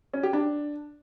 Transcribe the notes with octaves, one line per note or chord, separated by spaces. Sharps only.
C#4
G4
D4